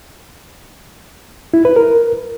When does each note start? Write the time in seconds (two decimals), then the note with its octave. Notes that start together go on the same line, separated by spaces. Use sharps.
1.54 E4
1.65 B4
1.76 A#4